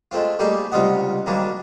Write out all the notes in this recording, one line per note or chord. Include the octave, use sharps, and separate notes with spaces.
G#3 A3 C4 F4
G3 A3 A#3 D#4 G4 G#4
C#2 C3 G3 F4 D#5 F#5
G#2 D#3 F#3 G3 A#3 D4